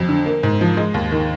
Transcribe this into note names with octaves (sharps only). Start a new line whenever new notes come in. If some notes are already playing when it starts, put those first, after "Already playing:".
Already playing: F2 F#3
D3
A#3
G#2
F3
G#3
D#2
D#3